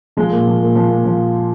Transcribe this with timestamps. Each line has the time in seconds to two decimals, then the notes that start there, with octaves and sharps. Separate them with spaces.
0.17 F3 G#3
0.31 A#2
0.47 F3
0.60 A#2
0.75 F3
0.90 A#2
1.05 F3